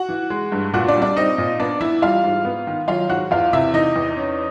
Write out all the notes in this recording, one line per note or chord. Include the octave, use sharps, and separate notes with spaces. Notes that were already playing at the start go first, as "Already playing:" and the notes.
Already playing: F#4 F#5
E3
G#3
G2
A#2 F#4 F#5
D4 D5
G3
D4 D5
C4 D#4 D#5
A#2
B3 D4 D5
E3 E4 E5
G3 F4 F5
G#2
B3
D#3
F#3 F4 F5
G#2 F#4 F#5
E2 F4 F5
C3 E4 E5
E3 D#4 D#5
E2
C#4